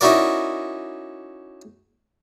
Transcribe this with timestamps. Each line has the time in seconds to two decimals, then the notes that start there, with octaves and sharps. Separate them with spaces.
0.01 C#4 D#4 E4 F#4 A#4 D5